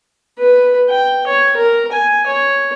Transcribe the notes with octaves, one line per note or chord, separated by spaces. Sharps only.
B4
G5
C#5
A#4
G#5
C#5